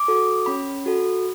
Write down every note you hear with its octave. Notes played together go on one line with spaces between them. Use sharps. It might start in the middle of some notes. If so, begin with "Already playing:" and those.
Already playing: D6
F#4 A4
C#4 B5
F#4 A4